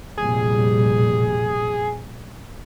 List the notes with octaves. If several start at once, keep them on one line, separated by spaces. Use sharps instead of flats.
F1 A#1 G3 G#4